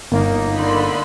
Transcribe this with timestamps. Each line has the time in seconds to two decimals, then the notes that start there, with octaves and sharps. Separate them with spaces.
0.12 G1 A#3 D#4
0.57 D3 B5 C6